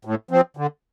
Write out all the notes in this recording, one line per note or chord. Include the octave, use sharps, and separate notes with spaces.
A2
F3 C4
D3